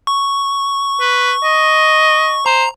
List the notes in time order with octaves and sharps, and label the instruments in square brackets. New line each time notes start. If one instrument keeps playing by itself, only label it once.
[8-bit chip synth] C#6
[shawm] B4
D#5
[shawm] C5 [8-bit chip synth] A#5